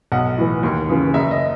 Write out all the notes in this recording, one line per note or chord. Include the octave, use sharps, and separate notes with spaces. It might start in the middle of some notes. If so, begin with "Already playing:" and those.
B1 F#5
A2 E3
D#2
C#3 E3
F#1 E5
D#5